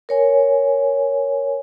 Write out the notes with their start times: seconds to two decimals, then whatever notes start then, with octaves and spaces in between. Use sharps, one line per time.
0.09 A#4 C#5 G#5